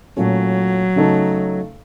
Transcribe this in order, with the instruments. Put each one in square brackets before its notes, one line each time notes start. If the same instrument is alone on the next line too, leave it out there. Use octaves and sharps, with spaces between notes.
[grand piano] A#2 A3 C#4 [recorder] F#3
[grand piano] C#3 A3 D#4 A4